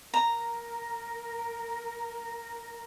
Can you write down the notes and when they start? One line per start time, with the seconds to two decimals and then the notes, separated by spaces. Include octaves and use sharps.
0.14 A#4 A#5